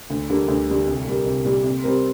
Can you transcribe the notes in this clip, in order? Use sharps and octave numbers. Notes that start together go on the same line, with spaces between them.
D2
D3 G3 A#3
D2
D3 G3 A#3
C2
A#2 G3 A#3
C2
A#2 G3 A#3
C3
G3 C4 A#4